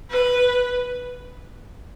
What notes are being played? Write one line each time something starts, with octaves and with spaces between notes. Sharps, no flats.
B4